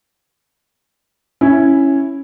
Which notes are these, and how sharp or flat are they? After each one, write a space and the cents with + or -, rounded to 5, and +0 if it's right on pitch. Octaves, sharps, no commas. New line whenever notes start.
C#4 -5 E4 +0